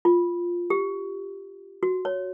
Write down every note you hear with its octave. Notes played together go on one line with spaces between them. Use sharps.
F4
G4
F#4
C#5